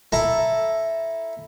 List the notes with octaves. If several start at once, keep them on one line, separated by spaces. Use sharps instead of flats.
E4 A4 A5 A#5